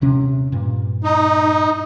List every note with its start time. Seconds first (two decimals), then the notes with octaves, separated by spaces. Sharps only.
0.01 D#1 C3 C#4
0.52 G2 A#2
1.04 D#4